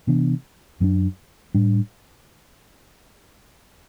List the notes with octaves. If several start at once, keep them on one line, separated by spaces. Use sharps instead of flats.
C3 E3 B3 D4
F#2 F#3 B3 D4
A2 G3 D4